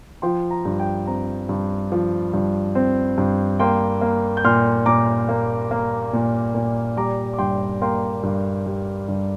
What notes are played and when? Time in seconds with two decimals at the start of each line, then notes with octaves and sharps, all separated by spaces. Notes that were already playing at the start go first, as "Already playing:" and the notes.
0.22 F3 G5 C6
0.51 A#5
0.65 G2
0.80 G5
1.07 C4 A#5
1.49 G2
1.92 F3
2.34 G2
2.75 C4
3.18 G2
3.60 A#3 G5 C6
4.01 A#3
4.37 G6
4.44 A#2 C6 F6
4.86 A#2 A#5 D6
5.29 A#3
5.71 A#3
6.13 A#2
6.55 A#2
6.96 G3 A#5 D6
7.33 D6
7.39 G2 G5 C6
7.81 A#3 G5 C6
8.23 G2
8.66 G3
9.08 G2